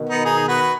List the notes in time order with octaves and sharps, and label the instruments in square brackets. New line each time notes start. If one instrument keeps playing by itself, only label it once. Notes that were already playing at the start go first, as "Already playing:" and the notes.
Already playing: [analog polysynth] B2 D#3
[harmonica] B3 D#4
D#4 G#4
F#4 B4